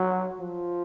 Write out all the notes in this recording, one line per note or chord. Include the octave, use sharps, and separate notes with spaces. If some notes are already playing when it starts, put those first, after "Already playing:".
Already playing: F#3
F3